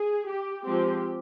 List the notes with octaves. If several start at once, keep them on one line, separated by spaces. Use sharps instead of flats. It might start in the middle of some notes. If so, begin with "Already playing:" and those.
Already playing: G#4
G4
F3 G#3 C4 G4